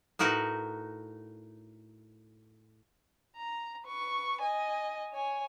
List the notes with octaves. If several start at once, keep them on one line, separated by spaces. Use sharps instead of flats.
A2 D#4 F#4 A#4 B4 F#5
A#5
B4 C#6
D#5 G#5
C#5 G#5